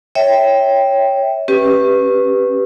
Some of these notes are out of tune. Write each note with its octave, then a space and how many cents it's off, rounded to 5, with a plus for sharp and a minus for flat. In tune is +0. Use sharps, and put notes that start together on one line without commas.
C#5 +0 E5 -20 G5 +0
C#4 -20 G4 +0 B4 +0